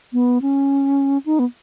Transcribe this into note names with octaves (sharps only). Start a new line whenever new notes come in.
B3
C#4
D#4
B3